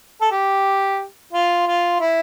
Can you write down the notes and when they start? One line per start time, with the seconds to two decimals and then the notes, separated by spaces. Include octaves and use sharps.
0.21 A4
0.31 G4
1.33 F4
1.67 F4
2.00 E4